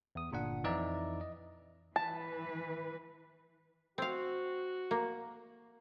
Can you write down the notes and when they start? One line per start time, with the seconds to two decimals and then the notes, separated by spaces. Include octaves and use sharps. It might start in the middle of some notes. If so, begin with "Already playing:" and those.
0.15 E2 D#6
0.31 G1 A#2 D4 F#5
0.64 F2 E3 D#4 D5 E5 A#5
1.21 D#5
1.96 E3 B4 A5
3.98 C4 F#4 F5
4.91 A#3